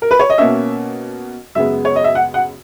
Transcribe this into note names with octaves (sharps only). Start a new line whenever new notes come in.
A#4
B4
C#5
D#5
B2 A#3 C#4 E5
F#2 C#3 G#3 B3 E5
C#5
D#5
E5
F#5
F#5